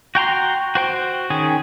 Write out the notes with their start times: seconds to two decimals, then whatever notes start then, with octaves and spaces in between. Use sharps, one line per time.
0.15 F#4 G5 A#5 C6
0.75 F#4 C5 G5
1.30 D#3 C#4 G#4